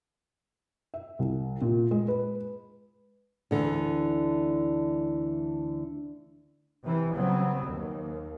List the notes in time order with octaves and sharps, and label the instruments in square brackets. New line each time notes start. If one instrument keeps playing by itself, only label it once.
[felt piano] E5
C2
A#2
G#3
B4
[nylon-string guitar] D2 D3 E3
[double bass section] C3 E3
C#3 F#3 G3 B3 C4
D#2